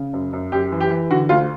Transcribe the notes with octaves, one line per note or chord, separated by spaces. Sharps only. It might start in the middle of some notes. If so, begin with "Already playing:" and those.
Already playing: C#3
F#2
F#2
F#2 G4
E3
G4
E3
D3 F#4
D2 F4